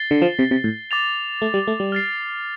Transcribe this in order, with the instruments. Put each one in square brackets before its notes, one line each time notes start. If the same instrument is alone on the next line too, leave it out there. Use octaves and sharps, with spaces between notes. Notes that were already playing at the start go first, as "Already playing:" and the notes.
Already playing: [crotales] A6 C7 G7
[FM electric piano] D3
F3
C3
C3
A2
[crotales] D6 A6 F7
[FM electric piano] A3
G3
A3
G3
[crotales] F6 A6 C7